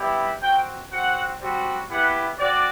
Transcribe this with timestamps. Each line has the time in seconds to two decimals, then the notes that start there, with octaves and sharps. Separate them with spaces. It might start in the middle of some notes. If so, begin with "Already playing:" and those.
Already playing: G3 B3 E4 G4
0.42 C4 F#4 G5
0.92 C4 F#4 F#5
1.41 G3 C4 F#4
1.90 B3 E4 G4 F#5
2.38 C4 F#4 D5